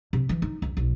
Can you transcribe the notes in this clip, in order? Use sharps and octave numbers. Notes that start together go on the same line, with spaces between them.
C3
E3
D#4
C#2
B1